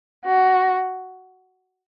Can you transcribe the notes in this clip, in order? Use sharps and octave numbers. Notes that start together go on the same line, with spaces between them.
F#4